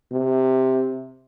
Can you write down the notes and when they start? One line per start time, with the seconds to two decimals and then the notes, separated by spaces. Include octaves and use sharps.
0.12 C3